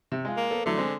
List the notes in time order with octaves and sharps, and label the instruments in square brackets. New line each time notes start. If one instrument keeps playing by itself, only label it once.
[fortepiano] C3
G#3 F4
[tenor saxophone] A#3
[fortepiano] B3 A4 C#5
[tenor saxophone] D3 [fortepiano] E3 F#3 A3
[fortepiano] G#3 C4